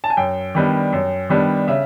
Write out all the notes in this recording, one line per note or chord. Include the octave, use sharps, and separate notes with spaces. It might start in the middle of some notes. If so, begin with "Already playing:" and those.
A5
G#5
F#2 G5
D#3 G3 B3 D4
F#2
D#3 G3 B3 D4
C#3 E5